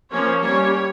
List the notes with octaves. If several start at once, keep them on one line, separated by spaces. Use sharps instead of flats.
F3 A#3 C#4 C#5
G3 C#4 C#5